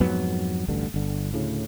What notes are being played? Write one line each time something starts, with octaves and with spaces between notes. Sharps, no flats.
F2 G#2 F#3 B3
A1 D2 G2 D3
G1 D3
D2 A2 C#3